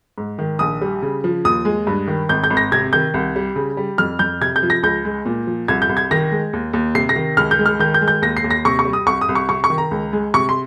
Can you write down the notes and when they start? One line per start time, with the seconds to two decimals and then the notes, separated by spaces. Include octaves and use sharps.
0.18 G#2
0.39 D#3
0.59 A#1 D#6
0.81 G3
1.03 C#3
1.24 F3
1.45 D#2 D#6
1.65 G#3
1.87 G2
2.08 D#3
2.29 G#1 G6
2.44 G6
2.50 G#1
2.57 A#6
2.72 C3 G#6
2.93 D#3 G6
3.14 C2
3.36 G3
3.56 C#3
3.77 G3
3.98 F2 F6
4.19 F2 G6
4.41 C3 G#6
4.56 G6
4.63 F3
4.70 A#6
4.83 C#2 G6
5.05 G#3
5.26 A#2
5.47 F3
5.68 C2 G#6
5.82 G6
5.89 C2
5.97 G#6
6.11 D#3 A#6
6.32 G#3
6.53 D#2
6.73 D#2
6.95 C3 C7
7.09 A#6
7.16 D#3
7.37 C#2 F6
7.51 G6
7.59 G#3
7.66 F6
7.79 D#3 G6
7.94 G6
8.01 G#3
8.08 G6
8.22 D#2 A#6
8.37 C7
8.44 D#2
8.51 A#6
8.65 C3 C#6
8.79 C#6
8.85 G3
8.93 D#6
9.06 C2 C#6
9.21 D#6
9.29 C2
9.35 C#6
9.49 C3 C#6
9.64 C#6
9.70 D#3
9.78 A#5
9.91 C#2
10.13 G#3
10.34 C3 C#6
10.49 C6